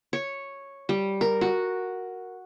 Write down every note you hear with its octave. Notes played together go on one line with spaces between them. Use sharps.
C#5
G3
A#4
F#4